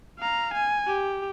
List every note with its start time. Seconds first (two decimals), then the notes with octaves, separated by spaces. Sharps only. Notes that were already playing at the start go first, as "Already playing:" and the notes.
0.19 F5 A#5
0.54 G#5
0.87 G4